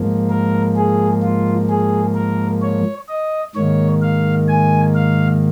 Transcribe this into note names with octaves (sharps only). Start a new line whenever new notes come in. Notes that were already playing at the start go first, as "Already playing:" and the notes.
Already playing: G#2 F3 A#3
A#4
G#4
F4
G#4
A#4
C#5
D#5
G#2 D#3 A#3 C#5
F5
G#5
F5